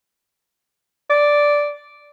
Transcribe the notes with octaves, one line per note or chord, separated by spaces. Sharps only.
D5